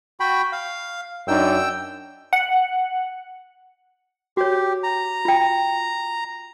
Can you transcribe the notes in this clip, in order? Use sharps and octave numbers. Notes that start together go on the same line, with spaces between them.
F#4 G5 B5
F5
F#2 D4 D#4 G5 E6
F#5
F#4 G4 C#5
A#5
F4 G5